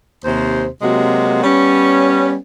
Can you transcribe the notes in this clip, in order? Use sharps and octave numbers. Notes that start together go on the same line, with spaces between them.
D#2 C3 C5
C3 F#3 G#3 A#3 F#4
G3 B3 C#4